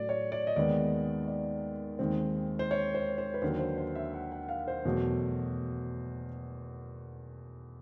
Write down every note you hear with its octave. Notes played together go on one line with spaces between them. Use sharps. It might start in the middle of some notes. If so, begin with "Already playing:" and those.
Already playing: A2 F#3 A3 D5
C#5
D5
D#5
D#2 D#3 G#3 B3 D5
D5
D#2 D#3 G#3 C4
C5
C#5
C5
C5
B4
D#2 D3 F#3 C5
C5
C5
E5
F#5
F#5
F5
C5
E2 B2 F#3 A3